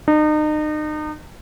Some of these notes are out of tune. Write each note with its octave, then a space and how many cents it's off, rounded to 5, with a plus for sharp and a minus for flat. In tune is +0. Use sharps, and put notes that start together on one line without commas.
D#4 -35